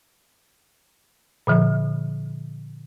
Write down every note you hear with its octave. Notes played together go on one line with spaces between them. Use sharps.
A#2 D3 F3